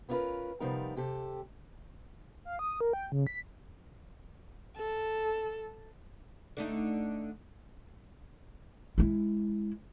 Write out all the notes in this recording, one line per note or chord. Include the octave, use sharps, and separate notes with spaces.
B3 C#4 E4 F4 A#4 B4
C3 F3 G3 B3 D#4 A#4
C3 G4 A4
F5
D#6
A#4
G5
C#3
B6
A4
D3 A3 D#4
G#3 E4